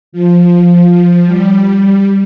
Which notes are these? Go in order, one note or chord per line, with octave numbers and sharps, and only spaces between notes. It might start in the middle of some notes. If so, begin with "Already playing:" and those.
F3
F3
G3
G3